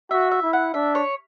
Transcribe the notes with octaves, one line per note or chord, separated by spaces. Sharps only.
F#4 E5
E5
E4
F#5
D4 E5
C#5